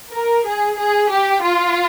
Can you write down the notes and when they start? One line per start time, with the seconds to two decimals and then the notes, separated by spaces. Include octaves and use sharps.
0.13 A#4
0.46 G#4
0.78 G#4
1.11 G4
1.43 F4